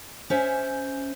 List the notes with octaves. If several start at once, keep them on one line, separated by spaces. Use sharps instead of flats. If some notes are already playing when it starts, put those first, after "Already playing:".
C#4 C5 E5 G#5